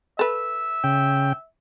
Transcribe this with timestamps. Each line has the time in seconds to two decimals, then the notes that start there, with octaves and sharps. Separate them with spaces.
0.19 A4 B4 E5
0.84 C#3 G5